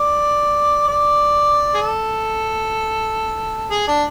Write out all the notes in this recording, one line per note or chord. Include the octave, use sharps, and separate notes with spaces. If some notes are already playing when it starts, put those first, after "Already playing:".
Already playing: D5
D5
G#4
A4
G#4
D4